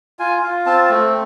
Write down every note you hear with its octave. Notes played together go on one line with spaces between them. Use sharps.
F4 G#5
F4
C4 A5
A3